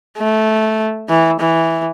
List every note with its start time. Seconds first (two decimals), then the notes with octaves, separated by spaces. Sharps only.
0.18 A3
1.09 E3
1.40 E3